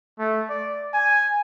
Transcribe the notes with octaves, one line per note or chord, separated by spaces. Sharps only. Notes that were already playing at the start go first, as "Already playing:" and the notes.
A3
D5
G#5